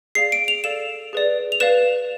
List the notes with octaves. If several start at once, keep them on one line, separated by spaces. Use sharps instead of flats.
G#4 D5 F5 C7
D7
F7
A4 D5 F5 E7
G#4 B4 D5
F7
B4 D5 F5 E7